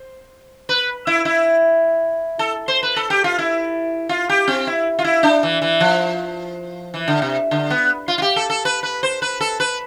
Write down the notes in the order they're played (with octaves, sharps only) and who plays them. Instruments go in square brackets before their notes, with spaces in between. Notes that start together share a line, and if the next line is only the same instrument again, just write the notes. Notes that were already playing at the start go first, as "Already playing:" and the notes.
Already playing: [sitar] C5
B4
E4
E4
A4
C5
B4
A4
G4
F4
E4
F4
G4
C4
E4
F4
E4
D4
E3
E3
F3
E3
D3
C3
D3
B3
F4
F4
G4
A4
A4
B4
B4
C5
B4
A4
B4